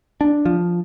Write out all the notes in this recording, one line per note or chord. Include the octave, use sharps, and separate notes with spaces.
D4
F3